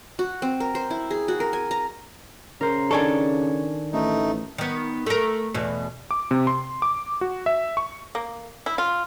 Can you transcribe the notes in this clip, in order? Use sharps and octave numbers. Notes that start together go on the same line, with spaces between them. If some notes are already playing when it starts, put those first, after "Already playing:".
F#4
C4
A#4
C5
E4
G#4
F#4
A#4
G#5
A#5
C#3 A#4 C5
D#3 D4 A4 G#5 C#6
A1 A3 D#4
D#3 B3
A3 A#4
E2 B2
D6
C3
C6
D6
F#4
E5
C#6
A#3
E4
F4